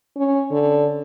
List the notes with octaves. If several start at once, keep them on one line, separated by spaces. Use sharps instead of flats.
C#4
D3